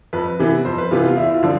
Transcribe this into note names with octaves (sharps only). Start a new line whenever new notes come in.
F2 B4
C3 E3 B3
F2 C5
B4
C3 E3 B3 F4
F4
E2 E4
F4
D3 F3